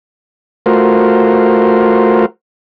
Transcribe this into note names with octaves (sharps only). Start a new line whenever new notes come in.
A3 F4 F#4 A#4 C5